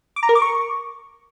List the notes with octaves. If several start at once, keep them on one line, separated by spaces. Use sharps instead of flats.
D6
A#5
A#4
D6
C#6